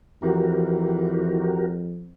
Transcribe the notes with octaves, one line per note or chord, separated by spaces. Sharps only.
F2 E3 F#4 G4 A#4